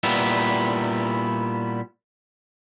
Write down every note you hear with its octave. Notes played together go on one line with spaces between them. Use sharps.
A#2 G3 B3 E4